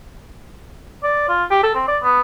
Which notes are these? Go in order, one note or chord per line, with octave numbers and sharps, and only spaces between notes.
D5
F4
G4
A4
C4
D5
B3